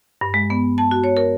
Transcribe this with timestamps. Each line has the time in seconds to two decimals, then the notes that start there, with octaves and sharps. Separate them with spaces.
0.21 G2
0.34 G#3
0.50 B3
0.78 A5
0.91 F#4
1.04 C#5
1.17 A#4